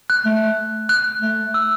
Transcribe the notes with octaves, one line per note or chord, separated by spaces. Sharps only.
F#6
A3
F#6
A3
E6